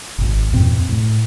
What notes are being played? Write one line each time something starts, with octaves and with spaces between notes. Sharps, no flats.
G#1 G#2
E2 G2 A#2 C4
A2